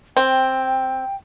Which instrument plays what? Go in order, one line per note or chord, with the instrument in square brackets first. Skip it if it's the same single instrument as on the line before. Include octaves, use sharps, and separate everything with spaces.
[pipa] C4 [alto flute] G5